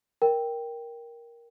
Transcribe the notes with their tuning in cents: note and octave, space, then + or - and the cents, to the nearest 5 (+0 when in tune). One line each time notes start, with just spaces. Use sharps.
A#4 +10 G5 +0